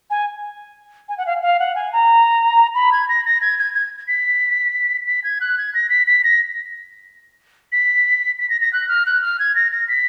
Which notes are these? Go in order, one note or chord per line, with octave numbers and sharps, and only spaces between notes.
G#5
G#5
F#5
F5
F5
F#5
G#5
A#5
B5
G#6
A#6
A#6
G#6
G#6
G#6
B6
B6
G#6
F#6
G#6
A#6
B6
B6
A#6
B6
B6
A#6
A#6
F#6
F6
F#6
F6
G#6
A#6
A#6
B6